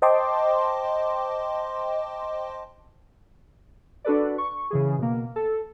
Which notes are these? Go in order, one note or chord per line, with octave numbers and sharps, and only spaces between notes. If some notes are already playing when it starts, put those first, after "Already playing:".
C5 D#5 G5 A5 C6 D6
D4 F#4 A4 B4 D5
C#6
C#3 E3 G#4
B2 A#3
A4